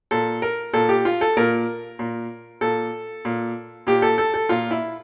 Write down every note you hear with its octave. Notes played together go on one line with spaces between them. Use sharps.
A#2 A4
A#4
A#2 A4
G4
F4
A4
A#2 A#4
A#2
A#2 A4
A#2
A#2 G4
A4
A4
A4
A#2 F4
E4